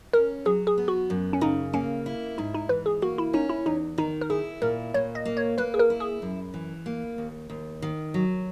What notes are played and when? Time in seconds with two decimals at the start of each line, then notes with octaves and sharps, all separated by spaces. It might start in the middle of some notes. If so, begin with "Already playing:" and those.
0.13 C#4 A#4
0.45 F#3 G#4
0.67 G#4
0.78 B3
0.88 F#4
1.10 F#2
1.33 C#4
1.41 C#3 D#4
1.73 A#3 C#4
2.06 E4
2.38 G#2 D#4
2.54 D#4
2.69 E3 B4
2.86 G#4
3.02 A#3 F#4
3.18 E4
3.33 C#4 D#4
3.49 E4
3.66 E2 D#4
3.98 D#3 D#4
4.21 A#4
4.30 E4 G#4
4.62 A#2 A#4
4.94 A#2 C#5
5.15 D#5
5.25 A#3
5.37 C#5
5.58 A#3 B4
5.74 G#4
5.79 A#4
5.90 E4
6.00 G#4
6.22 F#2
6.54 E3
6.86 A#3
7.18 D#2
7.50 D#2
7.82 D#3
8.14 F#3